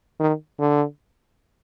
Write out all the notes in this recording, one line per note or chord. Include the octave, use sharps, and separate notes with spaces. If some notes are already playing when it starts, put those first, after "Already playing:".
D#3
D3